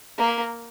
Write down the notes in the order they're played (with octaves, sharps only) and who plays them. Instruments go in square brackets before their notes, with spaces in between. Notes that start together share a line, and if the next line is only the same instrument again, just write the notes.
[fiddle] A#3